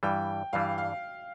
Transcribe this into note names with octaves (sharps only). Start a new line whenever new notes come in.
G2 E3 G3 G5
G2 E3 G3 F5
F5